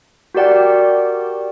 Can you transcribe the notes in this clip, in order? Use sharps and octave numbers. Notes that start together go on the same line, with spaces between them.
F#4 G4 A#4 D5 F#5 G5